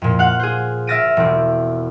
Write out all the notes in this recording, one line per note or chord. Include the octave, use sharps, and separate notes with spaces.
F2 A#2
F5 F#5 F#6
G#4 C5
E5 F6 A6 A#6 D7 D#7
E1 C4